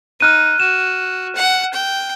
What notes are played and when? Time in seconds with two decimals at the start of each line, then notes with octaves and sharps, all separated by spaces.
0.20 D#4 F6 F#6 D#7
0.60 F#4 E7
1.35 F#5
1.74 G5